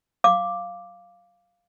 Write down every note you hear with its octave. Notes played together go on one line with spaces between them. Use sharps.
F5 D6